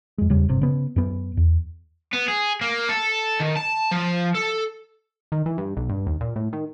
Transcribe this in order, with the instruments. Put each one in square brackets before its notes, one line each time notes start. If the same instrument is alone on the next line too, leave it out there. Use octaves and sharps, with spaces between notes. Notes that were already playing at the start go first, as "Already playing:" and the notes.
[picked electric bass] F2 G#3
E2 C#3 G3 C#4
G1 C3
C#3 B3
F#2 B3
E2
[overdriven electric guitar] B3
G#4
A#3
A4
D#3
A5
F3
A4
[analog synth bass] D#3
E3
G2
B1
G2
D#2
A#2
A2
D#3